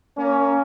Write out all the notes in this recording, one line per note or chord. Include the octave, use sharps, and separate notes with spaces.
A#3 C#4